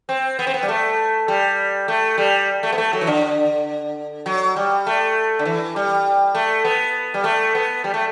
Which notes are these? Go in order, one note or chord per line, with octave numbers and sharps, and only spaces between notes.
C4
B3
C4
B3
G3
A3
G3
A3
G3
A3
B3
A3
F#3
E3
D3
F#3
G3
A3
D3
E3
G3
A3
B3
G3
A3
B3
G3
A3